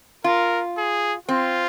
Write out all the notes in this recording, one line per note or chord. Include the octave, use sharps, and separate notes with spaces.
F4 A#4
G#4
C4 F4